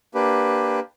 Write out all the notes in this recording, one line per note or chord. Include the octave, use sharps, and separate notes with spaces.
A#3 D4 G4 B4